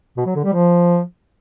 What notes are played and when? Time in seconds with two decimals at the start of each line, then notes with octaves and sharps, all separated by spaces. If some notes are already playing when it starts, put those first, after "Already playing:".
0.17 B2
0.26 F#3
0.35 D3
0.44 G3
0.53 F3